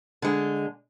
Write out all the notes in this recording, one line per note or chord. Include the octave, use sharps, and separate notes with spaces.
D3 G#3